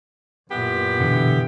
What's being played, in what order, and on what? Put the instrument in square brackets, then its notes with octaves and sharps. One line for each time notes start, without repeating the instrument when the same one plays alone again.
[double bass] F#2 A#2 [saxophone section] B3 E4 G4
[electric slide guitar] B2 D3 E3